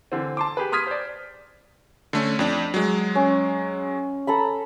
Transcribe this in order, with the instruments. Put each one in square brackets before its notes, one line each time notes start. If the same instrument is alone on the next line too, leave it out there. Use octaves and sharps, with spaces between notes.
[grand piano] D3 E3 C4
A5 C6 D6
G4 G#4 B4
C6 D#6 F6 G#6 B6 D#7
C5 D5
[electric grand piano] D3 A3 C#4
F2 D4
F#3 G#3
[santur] C#4
A4 A#5 B5